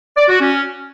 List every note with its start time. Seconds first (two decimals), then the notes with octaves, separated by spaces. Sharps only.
0.17 D5
0.29 F#4
0.41 C#4